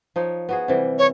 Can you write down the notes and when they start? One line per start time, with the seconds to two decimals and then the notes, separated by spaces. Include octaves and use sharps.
0.16 F3 D#4 C#5
0.49 B3 F#4 G#4
0.68 C3 E3 G3
0.98 C#5